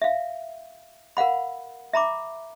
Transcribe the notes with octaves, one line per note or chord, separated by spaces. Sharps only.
E5 F5
A#4 F5 F#5 B5
E5 A#5 B5 D6